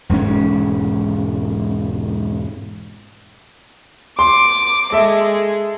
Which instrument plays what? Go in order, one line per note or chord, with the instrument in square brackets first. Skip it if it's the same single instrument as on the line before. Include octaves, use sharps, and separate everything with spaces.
[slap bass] E1 G#2 C4 C#4
[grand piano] C6 [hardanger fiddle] D6
[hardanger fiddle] G#3 [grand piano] A4 E5